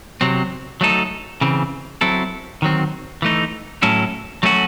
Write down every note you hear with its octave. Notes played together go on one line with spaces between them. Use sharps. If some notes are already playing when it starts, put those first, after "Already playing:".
C3 F#3 C4
F#3 A3 D#4 A4
C#3 E3 C4
F#3 C4 E4 A4
D#3 F#3 C4
E3 A3 D#4
A2 F#3 C#4 E4 A4
F#3 A3 C#4 F#4